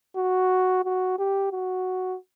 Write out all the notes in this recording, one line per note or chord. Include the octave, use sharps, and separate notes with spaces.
F#4
F#4
G4
F#4